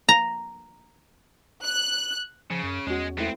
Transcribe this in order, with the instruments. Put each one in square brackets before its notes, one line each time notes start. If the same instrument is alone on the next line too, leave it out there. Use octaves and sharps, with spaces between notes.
[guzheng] A#5
[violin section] F#6
[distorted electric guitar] C#3 [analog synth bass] F3
[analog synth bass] F#2
[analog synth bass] E2 [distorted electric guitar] G#3 [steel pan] C#4 F#4
[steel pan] G#3 A3 E4 [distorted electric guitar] B3 C4